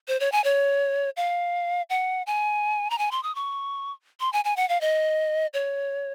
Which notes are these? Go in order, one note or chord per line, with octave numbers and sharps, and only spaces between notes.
C5
C#5
G#5
C#5
F5
F#5
G#5
A#5
G#5
C6
D#6
C#6
C6
G#5
G#5
F#5
F5
D#5
C#5